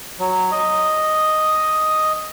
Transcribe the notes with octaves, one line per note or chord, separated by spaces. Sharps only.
F#3
D#5